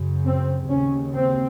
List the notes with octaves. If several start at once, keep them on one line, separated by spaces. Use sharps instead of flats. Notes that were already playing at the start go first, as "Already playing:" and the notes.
Already playing: F#2 C#3
C4
D#2 C#3 C#4
C4